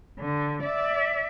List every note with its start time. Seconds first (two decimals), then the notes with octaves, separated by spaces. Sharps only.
0.19 D3
0.63 D5 E5